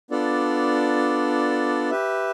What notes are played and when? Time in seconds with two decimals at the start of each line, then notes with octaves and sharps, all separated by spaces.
0.10 B3 D4 F4 A4 D5
1.90 G4 B4 E5